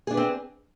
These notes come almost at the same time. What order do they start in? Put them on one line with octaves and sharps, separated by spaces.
G#4 D4 B4 C4